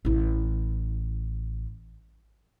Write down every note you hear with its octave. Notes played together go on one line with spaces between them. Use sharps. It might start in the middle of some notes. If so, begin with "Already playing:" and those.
A1 E4